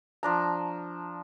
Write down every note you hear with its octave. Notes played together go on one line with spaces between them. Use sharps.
F3 D4 A#5